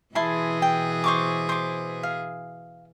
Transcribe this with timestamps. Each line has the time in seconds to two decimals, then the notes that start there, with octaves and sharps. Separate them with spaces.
0.15 B2 E3 E4 G#4 A5 C6
0.62 G5
1.04 C5 C#6 D6
1.49 C5 D6
2.03 F5